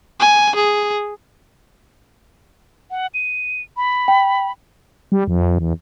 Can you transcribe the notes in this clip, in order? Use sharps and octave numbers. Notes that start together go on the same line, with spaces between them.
G#5
G#4
F#5
D#7
B5
G5
G3
F2
E2